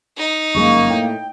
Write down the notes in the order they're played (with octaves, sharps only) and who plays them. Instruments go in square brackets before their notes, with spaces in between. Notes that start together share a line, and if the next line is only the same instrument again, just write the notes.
[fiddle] D#4
[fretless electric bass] G1 F#2 G#3 [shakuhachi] A#3 [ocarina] C#6
[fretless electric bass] A2 [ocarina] G5